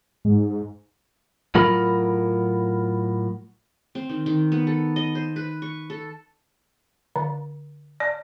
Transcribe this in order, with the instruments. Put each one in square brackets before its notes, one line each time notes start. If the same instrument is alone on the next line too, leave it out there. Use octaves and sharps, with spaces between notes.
[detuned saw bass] G#2
[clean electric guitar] A2 F#3 F4 A#4 B5
[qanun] C4
D#3
D#3
B3
A4
D#5
C5
B4
C#6
A4
[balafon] D3
D5